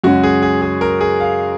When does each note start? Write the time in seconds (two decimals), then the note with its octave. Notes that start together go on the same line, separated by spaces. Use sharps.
0.04 F#2 C#3 G#3 C#4 F#4
0.23 G#4
0.42 G#4
0.62 G#4
0.81 A#4
1.01 G#4
1.20 F5